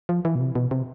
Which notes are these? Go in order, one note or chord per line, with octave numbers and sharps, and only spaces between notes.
F3
E3
B2
C3
B2
C3